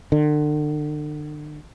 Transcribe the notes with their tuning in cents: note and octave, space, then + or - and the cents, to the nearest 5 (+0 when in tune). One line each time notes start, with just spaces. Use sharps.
D3 +35